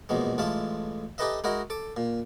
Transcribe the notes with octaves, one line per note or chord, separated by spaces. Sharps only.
A#1 E2 B2 G#3
A1 G#3 F4 A4 E5
D#4 G4 A4 B4 D#5 E5
G#3 E4 F#4 A#4 D#5
A4 D6
A#2